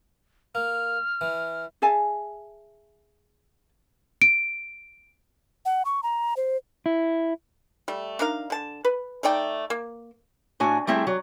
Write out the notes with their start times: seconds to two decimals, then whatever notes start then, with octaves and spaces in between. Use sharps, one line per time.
0.55 A#3 F6
1.21 E3
1.82 G#4 E5 G#5 A5
4.22 D7
5.65 F#5
5.85 C#6
6.03 A#5
6.37 C5
6.86 E4
7.88 G3 A3
8.19 D4 D#4 A#4 F5
8.50 D3 A5
8.85 B4
9.23 A3 D#4 D5 G5
9.70 A#3
10.60 A2 D4 F#4 G#5
10.87 G3 A3 C4 E4 G#4
11.07 F#3